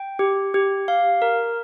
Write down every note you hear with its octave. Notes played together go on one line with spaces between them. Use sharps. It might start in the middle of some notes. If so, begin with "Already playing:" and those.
Already playing: G5
G4
G4
F5
A#4